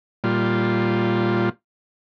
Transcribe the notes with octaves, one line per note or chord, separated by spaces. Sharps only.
A#2 G3 F4